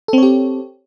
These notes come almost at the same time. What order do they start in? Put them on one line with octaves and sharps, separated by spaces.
A4 C4 C#5 G4